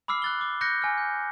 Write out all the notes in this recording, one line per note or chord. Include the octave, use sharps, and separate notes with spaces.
B5 D6 E6 F6 C7
F#6 A6 G7
D6
C#6 F#6 G6 A#6 C#7
G#5 F6
G6